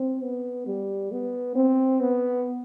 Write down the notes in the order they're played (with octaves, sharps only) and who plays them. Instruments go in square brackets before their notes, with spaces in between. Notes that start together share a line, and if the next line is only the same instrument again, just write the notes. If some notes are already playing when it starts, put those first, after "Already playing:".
Already playing: [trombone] C4
B3
G3
B3
C4
B3